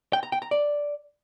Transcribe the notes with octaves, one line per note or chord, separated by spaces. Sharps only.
G5
A#5
G5
A#5
D5